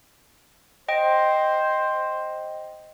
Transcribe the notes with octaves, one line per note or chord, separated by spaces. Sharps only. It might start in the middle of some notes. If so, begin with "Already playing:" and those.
C5 D#5 G5